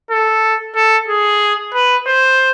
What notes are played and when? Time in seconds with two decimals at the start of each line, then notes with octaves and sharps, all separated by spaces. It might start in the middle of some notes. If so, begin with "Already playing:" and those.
0.10 A4
0.76 A4
1.08 G#4
1.74 B4
2.07 C5